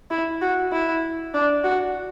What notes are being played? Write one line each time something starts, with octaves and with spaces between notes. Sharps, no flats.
E4
F#4
E4
D4
F#4